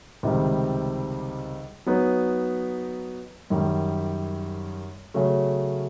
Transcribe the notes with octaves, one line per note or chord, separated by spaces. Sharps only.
C#2 C3 D#3 G3
F#3 B3 D#4
F#2 D#3 G3
C#3 F#3 A3